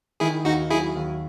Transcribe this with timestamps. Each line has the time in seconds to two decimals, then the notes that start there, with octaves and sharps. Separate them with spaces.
0.20 D#3 E4 G#4
0.45 D#2 D#4 F#4
0.70 F#3 E4 G#4
0.95 D#2